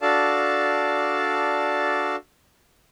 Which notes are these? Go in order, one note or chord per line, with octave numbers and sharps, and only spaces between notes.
D4 F#4 A4 D5 F5 A5